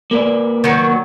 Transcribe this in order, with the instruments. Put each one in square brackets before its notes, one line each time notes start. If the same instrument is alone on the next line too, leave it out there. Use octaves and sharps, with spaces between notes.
[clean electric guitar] A#3 B4 D5
[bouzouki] D#3 F#3